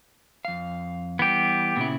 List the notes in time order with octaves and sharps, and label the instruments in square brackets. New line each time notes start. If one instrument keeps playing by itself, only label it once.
[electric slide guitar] F2 F5
[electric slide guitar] E3 G3 [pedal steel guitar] B3 G4
[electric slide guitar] A#2 C#3 E4